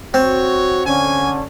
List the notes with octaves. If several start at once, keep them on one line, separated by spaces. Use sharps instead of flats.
C4 F#4 C#5
D3 C#4 G#5